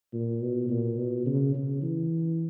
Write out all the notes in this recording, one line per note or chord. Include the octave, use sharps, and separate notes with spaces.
A#2
B2
A#2
B2
C#3
C#3
E3